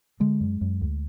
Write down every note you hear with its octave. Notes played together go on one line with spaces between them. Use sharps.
D3 G#3
F#2
F#2
D2